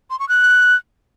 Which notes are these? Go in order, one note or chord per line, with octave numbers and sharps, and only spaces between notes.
C6
C#6
F#6